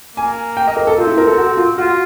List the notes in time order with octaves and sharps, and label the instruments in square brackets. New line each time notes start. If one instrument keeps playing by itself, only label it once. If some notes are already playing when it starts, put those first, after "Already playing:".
[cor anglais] A#3 [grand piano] G#5
[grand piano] G5
D#5
A#4
A4
[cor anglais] C4 [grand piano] F4
[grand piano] E4
A#4
A4
F#4
F4
[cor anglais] F4 [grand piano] F#4